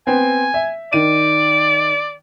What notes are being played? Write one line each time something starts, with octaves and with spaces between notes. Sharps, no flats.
B3 C4 G#5
E5
D#3 D5 D#7